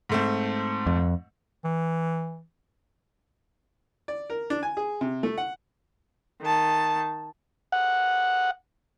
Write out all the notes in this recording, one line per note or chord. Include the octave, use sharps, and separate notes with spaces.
G#2 A3 C4
F2
E3
D5
A#4
D4
G#5
G#4
C3
A3
F#5
D#3 A5
F#5